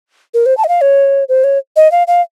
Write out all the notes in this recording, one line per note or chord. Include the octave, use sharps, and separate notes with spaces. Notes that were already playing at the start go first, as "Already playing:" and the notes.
A#4
C5
A5
D#5
F5
C#5
C5
C#5
D#5
F5
F5